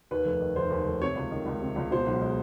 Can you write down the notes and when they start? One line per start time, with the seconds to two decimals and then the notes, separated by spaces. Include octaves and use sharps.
0.11 D#2 B4
0.25 F1
0.41 D#3
0.55 F1 C5
0.70 D#2
0.86 F1
1.01 C3 C#5
1.16 C#2
1.31 D#3
1.46 C#2
1.61 C3
1.76 C#2
1.91 B2 C5
2.06 B1
2.21 G#3